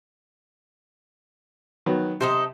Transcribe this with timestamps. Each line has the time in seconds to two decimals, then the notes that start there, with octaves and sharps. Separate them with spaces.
1.86 D#3 F#3 B3
2.21 C3 D#4 A4 C5